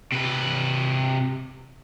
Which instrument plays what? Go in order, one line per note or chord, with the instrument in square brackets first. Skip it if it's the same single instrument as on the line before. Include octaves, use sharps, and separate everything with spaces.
[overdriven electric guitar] C3 B4